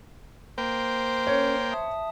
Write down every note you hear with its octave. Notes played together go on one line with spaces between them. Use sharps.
A#3 C5 G5
C#4 A#4 C#5
E5 A5 D#6